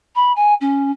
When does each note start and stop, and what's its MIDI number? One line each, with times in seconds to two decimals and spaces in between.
0.15 0.32 83
0.36 0.54 80
0.60 0.91 61